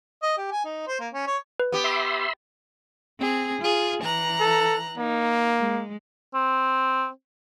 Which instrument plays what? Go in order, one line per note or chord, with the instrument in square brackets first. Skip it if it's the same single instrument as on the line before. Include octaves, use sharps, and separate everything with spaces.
[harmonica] D#5
G4
G#5
D#4
C5
A#3
C#4
C#5
[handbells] B4
[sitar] B3 G4
[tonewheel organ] E5 B5 C6
[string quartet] C4 G#4
F4 G#4
E3 A#5 F#6
[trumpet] A4
[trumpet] A#3 [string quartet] D#4
[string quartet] G#3
[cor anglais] C4